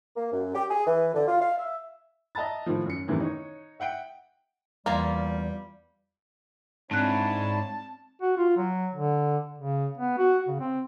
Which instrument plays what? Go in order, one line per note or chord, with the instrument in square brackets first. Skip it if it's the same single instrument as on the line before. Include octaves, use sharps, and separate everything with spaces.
[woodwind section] A#3
F#2
G4
G#4
E3
D3
F4
F5
E5
[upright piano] D#5 E5 A5 A#5 A6
A2 D#3 F3
F#2 C#7
F#2 A2 C3 D#3 E3 B3
D#4 C#5
E5 F#5 G5 D7
[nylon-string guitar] E2 G5 [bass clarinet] G3 [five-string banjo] A#3 [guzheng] F4 F5 A#5
[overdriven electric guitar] G#2 [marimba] C4 F#6 [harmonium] D4 E4 C#5 [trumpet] A5
[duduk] F#4
F4
F#3
D3
C#3
B3
F#4
C#3
C4